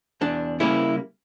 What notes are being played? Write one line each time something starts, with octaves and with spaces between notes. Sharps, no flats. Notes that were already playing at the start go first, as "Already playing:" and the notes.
E2 D4
C#3 G3 A#3 E4